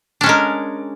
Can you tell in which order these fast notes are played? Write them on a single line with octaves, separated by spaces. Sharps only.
D4 C#4 G#3 A#4